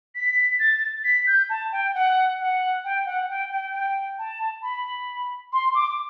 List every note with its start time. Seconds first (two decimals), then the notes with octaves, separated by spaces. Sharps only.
0.15 B6
0.59 A6
1.04 B6
1.27 G6
1.50 A5
1.72 G5
1.94 F#5
2.40 F#5
2.85 G5
3.06 F#5
3.29 G5
3.51 G5
3.73 G5
4.19 A5
4.63 B5
5.53 C6
5.75 D6